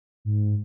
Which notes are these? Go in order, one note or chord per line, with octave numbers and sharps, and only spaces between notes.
G#2